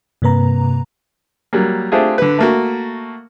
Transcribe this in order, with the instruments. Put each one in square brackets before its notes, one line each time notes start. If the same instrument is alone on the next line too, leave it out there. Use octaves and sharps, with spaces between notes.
[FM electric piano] G2 C3 A#3 B4 A#5
[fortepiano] F#3 G3 A#3
A3 C4 D4 F4 G4 G#4
D3 B4
A3 A#3 F#4